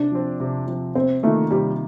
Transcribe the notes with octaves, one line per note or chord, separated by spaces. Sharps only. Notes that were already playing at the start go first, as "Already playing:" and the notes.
Already playing: C3 D4
F3 C4
C3
F3 C4
C3 C4
D#3 A3 A#3 F4
C3 G3